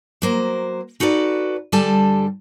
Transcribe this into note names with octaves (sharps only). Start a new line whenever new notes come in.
F#3 A#3 C5
D#4 F#4 A4 B4 D5
G2 D3 G3 A4 G#5 A5